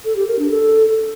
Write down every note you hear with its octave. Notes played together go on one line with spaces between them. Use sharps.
A4
G4
A#4
D4
A4